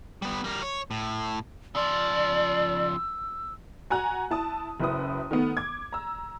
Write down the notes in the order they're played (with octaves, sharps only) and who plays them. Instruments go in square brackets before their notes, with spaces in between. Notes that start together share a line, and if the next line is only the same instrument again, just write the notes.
[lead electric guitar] G3 B3
G3 A#4
C#5
A2
[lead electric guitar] C#3 F3 [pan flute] D5 [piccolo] E6
[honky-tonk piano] F#4 G#5 A#5 F#6
E4 A5 D#6
F#1 F#2 E4 B4 D#6
D#3 A3 B3
D6 G#6
A#5 E6